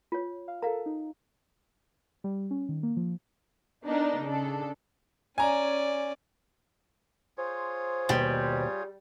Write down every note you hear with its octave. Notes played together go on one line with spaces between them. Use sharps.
F4 C#5
F5
A4 A#4 F5 A#5
D#4
G3
C#4
D#3
A#3
F3
B3 D4 D#4 A#4
C#3 D4 A4
C#4 D5 G#5 A#5
F4 G#4 C5 C#5
D#2 B2 G3 G5